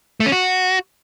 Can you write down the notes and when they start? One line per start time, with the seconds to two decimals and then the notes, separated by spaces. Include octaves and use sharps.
0.20 A3
0.26 C#4
0.32 F#4